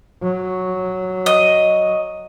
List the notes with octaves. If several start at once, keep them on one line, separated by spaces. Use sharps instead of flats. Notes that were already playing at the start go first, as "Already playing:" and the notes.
F#3
D#5